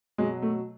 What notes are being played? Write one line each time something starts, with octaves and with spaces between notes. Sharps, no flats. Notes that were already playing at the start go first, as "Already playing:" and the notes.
B2 F#3 G#3
A3